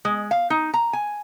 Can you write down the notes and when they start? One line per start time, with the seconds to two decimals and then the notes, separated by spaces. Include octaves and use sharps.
0.05 G#3
0.31 F5
0.50 D#4
0.74 A#5
0.93 G#5